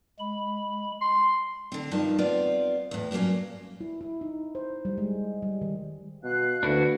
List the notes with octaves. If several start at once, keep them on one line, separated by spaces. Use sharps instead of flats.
G#3 B5
C6
D3 C4
G2 D#3 F3 A5
B3 C4 F4 D5
E2 A2
G2 A#2 F#3 A#3 C#4
E4
E4
D#4
C5
G3
G#3
G3
D#3
B2 F5 F#6
D2 D4 E4 F#4 B4